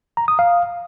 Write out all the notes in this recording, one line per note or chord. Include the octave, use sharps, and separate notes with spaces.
A#5
D#6
F5